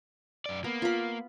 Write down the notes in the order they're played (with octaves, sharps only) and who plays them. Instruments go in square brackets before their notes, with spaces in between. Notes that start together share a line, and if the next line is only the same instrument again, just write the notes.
[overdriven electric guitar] F#2 D5
[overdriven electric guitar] A#3 [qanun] B3
[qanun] F4 B5